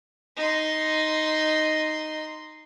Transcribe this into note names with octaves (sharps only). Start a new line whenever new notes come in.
D#4 C6